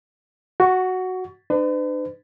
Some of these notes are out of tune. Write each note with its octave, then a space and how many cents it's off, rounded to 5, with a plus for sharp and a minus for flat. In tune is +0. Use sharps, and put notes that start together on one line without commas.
F#4 +0 C#6 +20
D4 +40 B4 +45